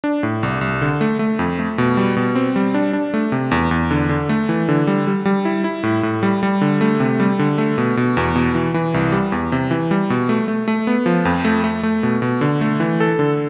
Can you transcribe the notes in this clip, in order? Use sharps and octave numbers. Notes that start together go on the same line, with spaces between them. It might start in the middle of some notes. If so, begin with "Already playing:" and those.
D4
A2
C2
C2
D3
A3
A3
F2
A3
B2
G3
B2
C4
G3
D4
D4
A3
C3
E2
E2
D3
D3
A3
E3
D3
G3
G3
G3
E4
E4
A2
A2
G3
G3
D3
A3
C3
G3
D3
A3
B2
B2
E2
B2
E3
E3
C2
G3
E2
C3
E3
G3
B2
A3
A3
A3
B3
F3
F2
A3
A3
A3
B2
B2
D3
A3
E3
A4
D3